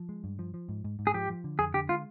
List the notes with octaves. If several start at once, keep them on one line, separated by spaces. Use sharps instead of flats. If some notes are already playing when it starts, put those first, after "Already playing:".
Already playing: F3
G#3
G2
F3
F3
G#2
G#2
G#2
G#4
F3 G4
F3
D3
F2 G#4
D3 G4
G#3 F4